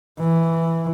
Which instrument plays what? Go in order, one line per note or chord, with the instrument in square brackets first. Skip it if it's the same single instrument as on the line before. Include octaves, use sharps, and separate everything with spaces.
[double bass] E3